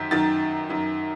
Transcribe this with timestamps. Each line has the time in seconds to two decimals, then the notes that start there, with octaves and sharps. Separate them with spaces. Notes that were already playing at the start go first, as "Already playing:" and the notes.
Already playing: F#2 D#3 G6 B6
0.11 F#2 D#3 A6
0.70 F#2 D#3